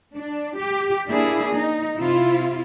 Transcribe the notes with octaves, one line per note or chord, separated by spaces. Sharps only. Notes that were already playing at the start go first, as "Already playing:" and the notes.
D4
G4
A#3 D4 E4 G#4
D#4
C3 E4 F4